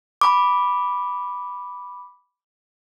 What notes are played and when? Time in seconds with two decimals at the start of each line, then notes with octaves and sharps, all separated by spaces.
0.21 B5 D6